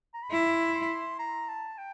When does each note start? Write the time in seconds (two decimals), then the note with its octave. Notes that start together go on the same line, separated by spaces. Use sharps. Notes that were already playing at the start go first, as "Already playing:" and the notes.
0.14 A#5
0.23 B5
0.31 E4 C6
0.75 C6
1.19 A#5
1.49 A5
1.78 G5